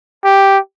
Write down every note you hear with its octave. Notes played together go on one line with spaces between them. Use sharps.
G4